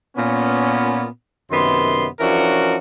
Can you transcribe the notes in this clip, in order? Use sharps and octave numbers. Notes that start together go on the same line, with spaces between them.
A#2 B3 C#4
F#2 C3 D#3 B3 C6
E3 F3 C#4 D4 F#4 A#4